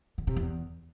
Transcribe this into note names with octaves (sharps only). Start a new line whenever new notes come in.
D3
C3
E2